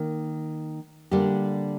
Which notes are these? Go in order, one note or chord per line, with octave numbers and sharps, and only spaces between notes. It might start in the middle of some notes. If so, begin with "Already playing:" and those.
Already playing: D#3 A#3
D3 G3 A#3 D4 G4